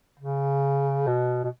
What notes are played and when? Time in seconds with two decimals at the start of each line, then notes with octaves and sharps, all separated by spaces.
0.19 C#3
1.07 B2
1.44 B2